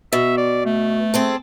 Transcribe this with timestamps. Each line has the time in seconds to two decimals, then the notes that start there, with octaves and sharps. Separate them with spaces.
0.13 B2 E5
0.37 D5
0.66 A3
1.14 C4 G#4 A4